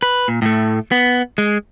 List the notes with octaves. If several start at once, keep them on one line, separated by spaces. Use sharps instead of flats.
B4
A#2
A2 A3
B3
G#3